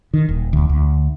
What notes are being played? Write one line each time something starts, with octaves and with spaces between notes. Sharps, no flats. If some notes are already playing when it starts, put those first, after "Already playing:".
D#3
D#1
D2
D2